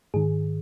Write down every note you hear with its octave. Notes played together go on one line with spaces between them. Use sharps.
G#2 D#3 G#4